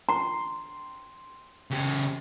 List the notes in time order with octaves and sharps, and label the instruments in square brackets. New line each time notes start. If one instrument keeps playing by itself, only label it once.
[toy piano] A#5 [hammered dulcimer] C6
[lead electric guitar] C#3 G4